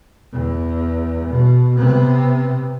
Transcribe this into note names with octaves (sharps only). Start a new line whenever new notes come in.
E2
B2
C3 B3